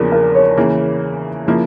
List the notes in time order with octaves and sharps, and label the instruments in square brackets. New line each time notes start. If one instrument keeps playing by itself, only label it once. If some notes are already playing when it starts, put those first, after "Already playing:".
Already playing: [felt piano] E2 C#3 F3 A#3 D4 [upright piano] A#4
[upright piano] A#4
C#5
[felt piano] C#3 E3 A#3
C#3 F3 A#3 E4